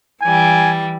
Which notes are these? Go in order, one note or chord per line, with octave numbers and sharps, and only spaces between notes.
E3 G3 G#5